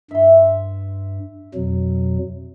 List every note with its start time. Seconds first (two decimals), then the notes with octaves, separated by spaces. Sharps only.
0.11 G2 E5 C6
1.55 F2 B2 F#3